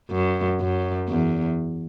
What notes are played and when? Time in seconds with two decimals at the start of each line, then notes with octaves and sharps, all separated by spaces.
0.10 F#2
0.60 F#2
1.09 E2